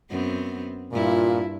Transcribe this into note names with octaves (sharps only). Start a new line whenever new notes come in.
F#2 B3 C4
G2 A#2 E4 F4